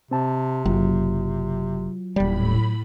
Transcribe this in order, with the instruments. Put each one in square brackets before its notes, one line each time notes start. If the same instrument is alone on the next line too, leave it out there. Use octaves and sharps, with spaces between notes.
[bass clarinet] C3 [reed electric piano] C4 A5
[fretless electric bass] F#1 [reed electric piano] F#3 F4
[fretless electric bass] D#1 G3 [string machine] A2 B5